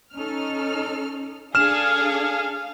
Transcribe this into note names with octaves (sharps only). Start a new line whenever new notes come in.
C#4 D#4 A4 F6
D4 G#4 A4 F5 F6 E7